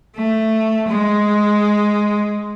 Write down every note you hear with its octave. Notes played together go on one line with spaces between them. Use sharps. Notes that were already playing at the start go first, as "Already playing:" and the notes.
A3
G#3